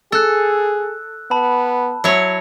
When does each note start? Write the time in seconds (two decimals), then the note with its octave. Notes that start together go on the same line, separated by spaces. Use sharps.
0.12 G#4 A4 E6 F#6
1.31 B3 A5 B5
2.04 F#3 E4 C#5